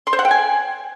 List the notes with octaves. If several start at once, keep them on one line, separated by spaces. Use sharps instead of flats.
C6
C5
F#5
G5
G#5